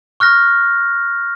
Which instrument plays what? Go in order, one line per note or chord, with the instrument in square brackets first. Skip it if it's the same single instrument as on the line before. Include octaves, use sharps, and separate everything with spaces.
[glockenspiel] C#6 F6 F#6 A#6